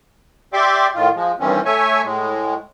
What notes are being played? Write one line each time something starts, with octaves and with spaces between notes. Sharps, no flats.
G4 D5 E5 G5 C6 D6
A2 D#3 F4
F3 G#3
G2 D#3 E3 C4 C#4
A3 C#5 E5 G#5
A2 G#3